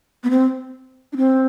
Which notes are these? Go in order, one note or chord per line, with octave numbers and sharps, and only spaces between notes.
B3
C4
D4
C4